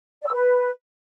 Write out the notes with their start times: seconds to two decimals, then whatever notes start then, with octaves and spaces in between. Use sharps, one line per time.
0.21 D5
0.27 E6
0.33 B4